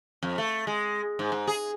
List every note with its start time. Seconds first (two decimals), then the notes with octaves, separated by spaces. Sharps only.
0.23 F2
0.38 A3
0.67 G#3
1.19 G#2
1.32 G#2
1.47 G#4